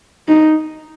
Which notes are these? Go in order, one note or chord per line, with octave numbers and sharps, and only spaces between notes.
D#4